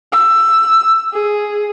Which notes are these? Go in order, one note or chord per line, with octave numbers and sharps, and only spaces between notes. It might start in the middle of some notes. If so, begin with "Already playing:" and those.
E6
G#4